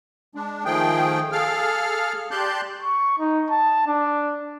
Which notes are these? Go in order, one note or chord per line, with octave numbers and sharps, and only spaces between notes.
G#3 D4
D#3 F3 A3 G#4 G5
G#4 A4 F5 F6
G4 D5 A5 C6 F#6 G6
C#6
D#4
A5
D4